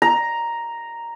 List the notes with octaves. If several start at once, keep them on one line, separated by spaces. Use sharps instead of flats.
A#5